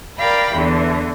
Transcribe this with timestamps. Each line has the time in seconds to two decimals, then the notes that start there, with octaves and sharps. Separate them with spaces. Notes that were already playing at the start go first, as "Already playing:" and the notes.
0.18 A#4 D5 F5 G5 B5
0.53 E2 D3 E3